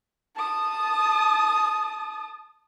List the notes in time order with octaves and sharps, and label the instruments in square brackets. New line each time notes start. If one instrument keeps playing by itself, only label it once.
[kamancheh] A5 D#6